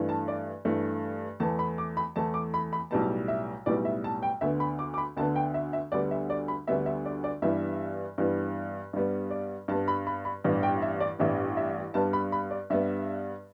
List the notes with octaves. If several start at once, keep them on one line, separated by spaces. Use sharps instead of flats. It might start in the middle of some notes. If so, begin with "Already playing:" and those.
Already playing: G2 E3 A3
A5
D5
G2 E3 A3
E2 E3 A3 A5
B5
D6
B5
E2 E3 A3 A5
D6
B5
B5
B1 A2 G3 B3 A5
E5
B1 A2 G3 B3 D5
E5
A5
G5
D2 D3 B3 E5
B5
D6
D6
B5
D2 D3 B3 A5
G5
E5
E5
D2 D3 G3 B3 D5
E5
D5
B5
D2 D3 G3 B3 E5
E5
D5
D5
G2 E3 G3 B3 E5
G2 E3 G3 B3
G2 G3 B3
D5
G2 G3 B3 A5
B5
B5
B5
A1 G2 G3 B3
G5
E5
D5
A1 G2 G3 B3 E5
E5
G2 G3 B3 A5
B5
B5
D5
G2 G3 B3 E5